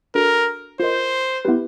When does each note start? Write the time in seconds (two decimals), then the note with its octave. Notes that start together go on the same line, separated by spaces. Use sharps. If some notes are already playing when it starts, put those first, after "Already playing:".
0.15 D4 F#4 A4 A#4
0.80 F4 A#4 C5 D#5
1.45 B3 E4 G4 B4